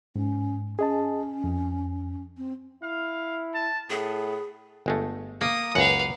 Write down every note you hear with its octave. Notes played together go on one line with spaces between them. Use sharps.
G#2 C#4
C#4 G#4 D#5 A5
F2
C4
E4 F5
A5
A2 B3 G#4
G1 G#3 A3
A#3 D#6
C#2 F#2 B4 F5 F#5